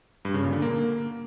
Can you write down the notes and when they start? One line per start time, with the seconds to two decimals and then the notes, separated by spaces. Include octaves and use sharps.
0.25 G2
0.34 C#3
0.43 A#2
0.53 D3
0.62 A#3